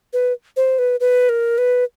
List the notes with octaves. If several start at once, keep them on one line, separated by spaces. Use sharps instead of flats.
B4
C5
B4
B4
A#4
B4